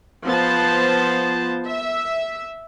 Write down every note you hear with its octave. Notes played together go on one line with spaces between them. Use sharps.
F3 B3 C5 A5
E5